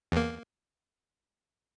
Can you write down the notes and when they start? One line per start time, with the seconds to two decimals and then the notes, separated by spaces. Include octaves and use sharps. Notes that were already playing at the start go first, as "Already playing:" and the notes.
0.12 E2 A#3